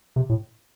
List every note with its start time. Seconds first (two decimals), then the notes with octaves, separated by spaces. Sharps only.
0.16 C3
0.29 A2